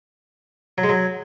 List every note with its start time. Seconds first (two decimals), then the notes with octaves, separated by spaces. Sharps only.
0.78 F#3
0.83 G#3
0.89 F#3